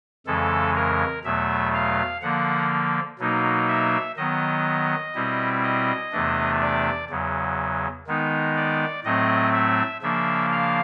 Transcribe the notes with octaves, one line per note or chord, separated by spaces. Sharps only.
F2 C#3 E3 G#3 A4
A#4
E2 B2 F#3 A3 E5
F5
D3 F3 A#3 F#5
B2 F#3 A#3 D#4
E5
D#3 F#3 B3 D#5
B2 G3 C4 E4
D#5
E2 C3 E3 A3 D4
D5
E2 C#3 F#3
D#3 G#3 B3 D#4
D5
A2 F#3 A3 C4 D#5
E5
C#3 F3 A#3 D4 E5
F5